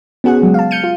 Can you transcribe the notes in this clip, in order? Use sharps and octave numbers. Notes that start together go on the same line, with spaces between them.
B3 C#4 F#4 G#4 F#5
C#3 F#3 G#3
F5 A5
F6 G6 C#7 D#7
F4